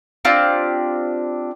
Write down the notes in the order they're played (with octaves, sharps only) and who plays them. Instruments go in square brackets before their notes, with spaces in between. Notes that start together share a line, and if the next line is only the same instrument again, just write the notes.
[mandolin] C4 D4 F4 G4